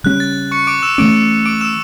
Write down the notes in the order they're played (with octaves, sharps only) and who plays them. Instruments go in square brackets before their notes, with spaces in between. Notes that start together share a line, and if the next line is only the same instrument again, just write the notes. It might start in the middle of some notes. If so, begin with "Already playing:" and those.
[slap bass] C#3 G3 C#4 [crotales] F#6
[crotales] A6
C#6 C#7
D6 D7
E6 E7
[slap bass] E3 A3 C#4 [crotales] D6 D7
[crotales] D6 D7
E6 E7